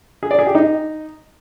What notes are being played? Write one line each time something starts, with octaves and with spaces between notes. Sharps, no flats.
G#4
D5
G#4
G4
D#4